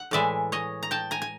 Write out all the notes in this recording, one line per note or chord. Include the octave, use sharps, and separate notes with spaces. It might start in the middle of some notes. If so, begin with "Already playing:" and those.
Already playing: F#5
A2 E3 G#3 D5 E5
C#5 D#5
A#5
G5 A5
G#5 A#5
G#5